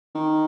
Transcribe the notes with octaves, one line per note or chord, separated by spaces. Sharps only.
D#3